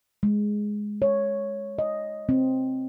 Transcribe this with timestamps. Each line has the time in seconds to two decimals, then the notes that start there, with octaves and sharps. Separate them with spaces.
0.23 G#3
1.02 C#5
1.79 D#5
2.29 C4